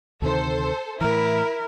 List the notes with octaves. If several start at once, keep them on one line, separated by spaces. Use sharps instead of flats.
D2 C3 D#3 A4 C5
A2 E3 E4 A#4